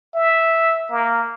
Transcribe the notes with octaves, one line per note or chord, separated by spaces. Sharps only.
E5
A#3